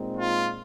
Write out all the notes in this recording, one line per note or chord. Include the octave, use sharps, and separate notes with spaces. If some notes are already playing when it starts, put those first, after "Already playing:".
Already playing: A#2 G#3 C4 D#4
F4